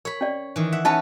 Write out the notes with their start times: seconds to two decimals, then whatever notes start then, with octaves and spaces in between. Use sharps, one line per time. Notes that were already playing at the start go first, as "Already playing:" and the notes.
0.05 A#4 C#5 B5
0.21 C#4 D5
0.56 D#3 E3
0.72 E5 F#5
0.85 B3 C#4 D#4 B4 E5 A5